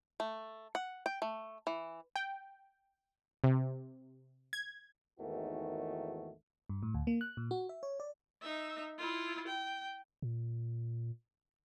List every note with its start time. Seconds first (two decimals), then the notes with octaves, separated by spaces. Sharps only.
0.20 A3
0.75 F#5
1.06 G5
1.22 A3
1.67 E3
2.16 G5
3.44 C3
4.53 G#6
5.20 G#1 E2 D#3 E3 A3 F#4
6.69 G2
6.83 A2
6.94 D2
7.07 A#3
7.21 F#6
7.37 A#2
7.51 F#4
7.69 E5
7.83 C#5
8.00 D5
8.42 D#4 E5
8.98 E4 F4
9.48 G5
10.22 A#2